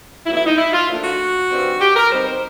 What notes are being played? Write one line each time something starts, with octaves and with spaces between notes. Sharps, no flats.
A2 F#3 B3 E4
E4
D#4
E4
F4
A#2 F3 A3 D4
F#4
G2 D#3 G3 C4
G4
A#4
B2 G3 C4 D#4 C5
C5